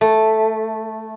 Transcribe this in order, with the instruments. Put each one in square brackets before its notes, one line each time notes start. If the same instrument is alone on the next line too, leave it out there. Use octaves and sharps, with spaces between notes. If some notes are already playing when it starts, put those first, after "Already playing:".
[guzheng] A3